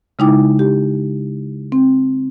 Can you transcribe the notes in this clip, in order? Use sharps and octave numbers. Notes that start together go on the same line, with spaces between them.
C#3 G#3 D#4 E4 G5 D6
G4
C4